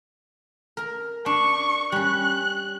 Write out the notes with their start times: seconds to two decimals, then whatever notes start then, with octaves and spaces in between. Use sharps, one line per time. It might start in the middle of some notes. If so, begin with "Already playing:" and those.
0.77 A#4 A#5
1.26 D4 C#6
1.92 G3 C#4 F#6